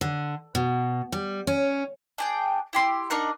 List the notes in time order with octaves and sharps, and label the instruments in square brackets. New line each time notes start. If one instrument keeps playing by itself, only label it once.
[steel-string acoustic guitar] D3
B2
G3
C#4
[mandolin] D4 G#4 G5
E4 G4 C6
D4 D#4 A#4 F#5